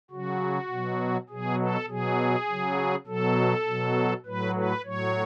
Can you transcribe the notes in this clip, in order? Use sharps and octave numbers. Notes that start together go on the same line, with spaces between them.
C#3 F#3 F#4
B2 F#3
B2 F#3 G#4
A4
B2 F#3 G#4
C#3 F#3
B2 F#3 A4
B2 F#3
A2 F#3 B4
B4
A2 F#3 C#5